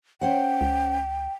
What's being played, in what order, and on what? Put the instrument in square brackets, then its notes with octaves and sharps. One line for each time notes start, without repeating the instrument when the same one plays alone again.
[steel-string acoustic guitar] C#4 C5 F#5 [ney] G5
[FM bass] C#2